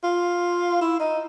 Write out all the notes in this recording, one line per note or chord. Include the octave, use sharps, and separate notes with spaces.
F4
E4
D#4